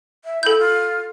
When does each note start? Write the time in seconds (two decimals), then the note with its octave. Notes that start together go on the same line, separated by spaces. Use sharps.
0.25 E5
0.43 E4 A4 G6
0.59 F4